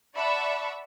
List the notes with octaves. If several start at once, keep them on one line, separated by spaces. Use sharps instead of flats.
D5 E5 F#5 A5 B5 C#6